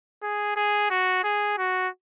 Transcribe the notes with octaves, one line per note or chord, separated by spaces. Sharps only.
G#4
G#4
F#4
G#4
F#4